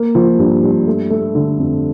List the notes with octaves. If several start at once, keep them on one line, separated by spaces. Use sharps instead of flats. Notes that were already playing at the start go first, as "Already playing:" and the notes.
Already playing: A#3
F3
G2
G2
A3
A3
D3
F2